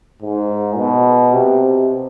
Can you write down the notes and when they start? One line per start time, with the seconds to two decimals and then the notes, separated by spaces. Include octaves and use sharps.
0.22 G#2
0.77 B2
1.34 C3